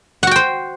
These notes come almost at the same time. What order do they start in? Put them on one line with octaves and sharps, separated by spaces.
F#5 F#4 G5 C5